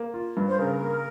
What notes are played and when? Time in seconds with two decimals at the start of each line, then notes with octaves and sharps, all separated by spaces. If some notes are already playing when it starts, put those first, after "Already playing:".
Already playing: A#3
0.14 F4
0.37 G2
0.47 C5
0.59 C#3 A#4
0.81 A#3